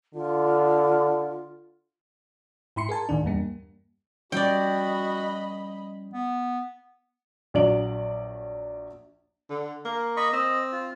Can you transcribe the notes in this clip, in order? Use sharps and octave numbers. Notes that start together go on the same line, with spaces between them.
D3 F4
G#2 E4 B5 C6 C#7
G#4 A#4 G#5 A5
D2 A2 D#3 D4
E2 G2 G3 A#3
F3 G3 C#4 F#4 D5 D#5 G5 B5
B3
A#1 F#3 D5 D7 F#7
D3
A#3
D#5 B5 C#6
C4 D#5
F4